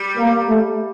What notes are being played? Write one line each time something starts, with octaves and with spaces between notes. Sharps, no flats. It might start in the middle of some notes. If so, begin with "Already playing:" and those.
Already playing: G3
A#3
A3